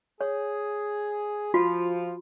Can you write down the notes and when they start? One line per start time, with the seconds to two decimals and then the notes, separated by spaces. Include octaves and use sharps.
0.21 G#4 C#5
1.54 F3 F4 F#4